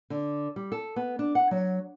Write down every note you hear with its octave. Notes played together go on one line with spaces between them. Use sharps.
D3
G3
A4
B3
D4
F#5
F#3